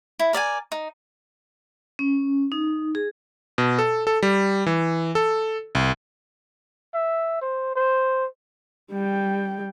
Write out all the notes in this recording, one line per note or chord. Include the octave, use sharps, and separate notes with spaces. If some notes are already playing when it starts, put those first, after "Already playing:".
E4
A#4 D5 E5 G#5
D#4
C#4
D#4
G#4
B2
A4
A4
G3
E3
A4
C2
E5
C5
C5
G3 G5